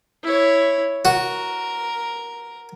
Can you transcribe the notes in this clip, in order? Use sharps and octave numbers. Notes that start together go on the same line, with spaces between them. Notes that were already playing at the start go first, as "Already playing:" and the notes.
E4 C#5
F#4 A#4